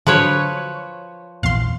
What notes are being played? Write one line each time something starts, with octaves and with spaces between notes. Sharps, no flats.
D3 F3 F#3 B4 C#5
A#1 E2 F5 C6